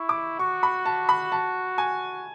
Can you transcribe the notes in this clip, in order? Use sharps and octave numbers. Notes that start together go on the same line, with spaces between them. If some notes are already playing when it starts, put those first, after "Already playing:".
Already playing: E4 C#6
D6
F#4 C#6
B5
A5
B5
A5
G#5